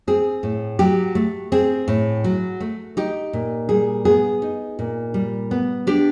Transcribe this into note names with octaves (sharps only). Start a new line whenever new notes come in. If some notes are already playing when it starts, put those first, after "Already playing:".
C4 G#4
A2
F#3 G4
A3
C4 G#4
A2
F#3
A3
D#4 G4
A#2
G3 G#4
B3 G#4
D#4
A#2
G3
B3
D4 G4